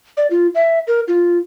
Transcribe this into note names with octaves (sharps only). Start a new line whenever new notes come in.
D5
F4
E5
A#4
F4